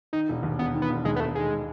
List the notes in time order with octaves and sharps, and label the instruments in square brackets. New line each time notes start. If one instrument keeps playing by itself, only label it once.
[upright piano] D#3 [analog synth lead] D#4
[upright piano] E1
D#2
[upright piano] E1 [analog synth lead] B3
[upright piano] D#3
[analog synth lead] B3
[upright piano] E1
[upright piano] D#2 [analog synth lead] G#3
[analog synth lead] B3
[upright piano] E1 [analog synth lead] A3
[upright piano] D#3 [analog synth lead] G#3